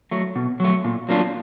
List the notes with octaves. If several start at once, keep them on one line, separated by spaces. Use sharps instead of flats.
F#3 A3
B2
F#3 A3
A#2
F#3 A#3 D4 F4